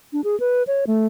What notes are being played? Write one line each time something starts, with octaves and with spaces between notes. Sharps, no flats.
D4
G#4
B4
C#5
A3